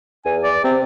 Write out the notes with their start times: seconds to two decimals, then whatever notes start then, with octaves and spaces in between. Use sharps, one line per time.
0.25 E2 G#5
0.43 D5
0.64 C3 C4